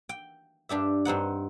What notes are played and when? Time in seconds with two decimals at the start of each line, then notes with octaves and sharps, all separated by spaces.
0.09 G5
0.69 G2 D4 G4 E5
1.05 G2 C4 D#4 F#5